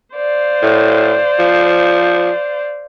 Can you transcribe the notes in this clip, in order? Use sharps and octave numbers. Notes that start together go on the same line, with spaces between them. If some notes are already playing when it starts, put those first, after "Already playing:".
C5 D5 F5
A2
F3